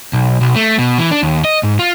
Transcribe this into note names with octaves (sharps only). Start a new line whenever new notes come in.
B1
B1
A3
B2
E3
D4
D#2
D#5
G#2
F4